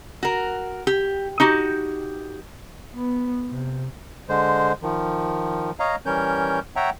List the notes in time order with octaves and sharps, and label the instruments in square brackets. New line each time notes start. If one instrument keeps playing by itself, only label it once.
[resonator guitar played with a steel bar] F#4 A#4
G4
D#4 F#4 G4
[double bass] B3
C3
[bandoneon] D3 G#3 C5
D#3 F3
C#5 D#5 F5 A#5
E3 G3 C#4 A#4 C#5 G6
C#5 E5 F#5 G5 A#5